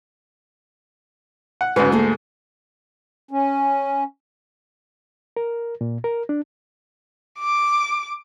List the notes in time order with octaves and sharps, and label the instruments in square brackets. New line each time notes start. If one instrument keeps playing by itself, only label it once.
[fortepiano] F#5
[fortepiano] D2 G#2 [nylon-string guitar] C#4 F#4 B4
[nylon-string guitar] A3 A#3 G#4
[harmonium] C#4
[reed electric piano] A#4
A#2
A#4
D4
[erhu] D6